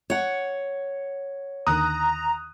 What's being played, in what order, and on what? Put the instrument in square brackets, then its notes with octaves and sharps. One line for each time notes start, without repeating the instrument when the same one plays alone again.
[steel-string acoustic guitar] C#5 F#5
[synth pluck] D#2 D3 D#3 [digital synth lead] A#5 [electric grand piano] D#6 F#6